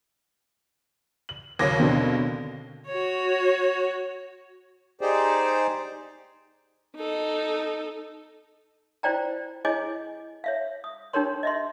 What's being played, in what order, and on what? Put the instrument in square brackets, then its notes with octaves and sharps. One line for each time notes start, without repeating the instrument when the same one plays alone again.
[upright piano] F#7
[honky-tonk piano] D#2 C#3 F#3 [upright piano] D6 G#6 A#6
[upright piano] B2 D3 C4
[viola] F#4 C#5
[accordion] D#4 G4 G#4 C5 D5
[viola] D#4 A4
[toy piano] E4 F4 C5 D5 G5 A#5
E4 G#4 C#5 D#5 G#5 D6
C#5 E5 F5
D#6
D4 D#4 G4 A#4 C#5 C6
D#5 E5 C6